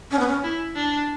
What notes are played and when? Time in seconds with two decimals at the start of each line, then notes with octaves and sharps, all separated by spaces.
0.11 C#4
0.19 B3
0.28 C#4
0.44 E4
0.76 D4